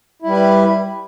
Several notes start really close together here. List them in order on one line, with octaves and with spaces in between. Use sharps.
E4 G3 B4